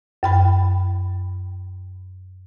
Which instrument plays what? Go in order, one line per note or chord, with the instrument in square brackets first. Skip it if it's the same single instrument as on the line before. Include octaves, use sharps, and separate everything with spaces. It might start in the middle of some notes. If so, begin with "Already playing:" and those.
[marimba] F#2 G5 B5